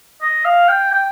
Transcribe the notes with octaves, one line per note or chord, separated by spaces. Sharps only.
D#5
F5
G5
G5